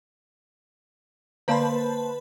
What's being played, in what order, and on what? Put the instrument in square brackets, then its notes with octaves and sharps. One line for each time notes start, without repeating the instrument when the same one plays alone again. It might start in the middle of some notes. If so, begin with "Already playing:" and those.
[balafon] D3 D5 F5 [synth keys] A#3 C5 [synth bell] B4 A5 B5